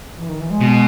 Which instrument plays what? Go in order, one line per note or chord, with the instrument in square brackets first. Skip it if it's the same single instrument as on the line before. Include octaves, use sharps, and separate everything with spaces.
[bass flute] E3
D#3
E3
G#3
[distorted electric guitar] B2